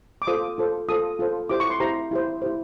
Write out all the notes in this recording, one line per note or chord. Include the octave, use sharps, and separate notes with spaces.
D6
F4 A4 C5 D#6
F4 A4 C5
F4 A4 C5 D#6
F4 A4 C5
E4 G4 C5 D6
C#6
C6
E4 G4 C5 A#5
E4 G4 C5
E4 G4 C5